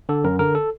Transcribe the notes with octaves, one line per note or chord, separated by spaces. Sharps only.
D3 A4
F#2 A#4
D3 A#4
A4